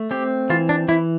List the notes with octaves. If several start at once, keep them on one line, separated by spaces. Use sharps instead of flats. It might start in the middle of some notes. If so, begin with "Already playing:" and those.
Already playing: A3
C4 G4
E3 F4
D4
E3 E4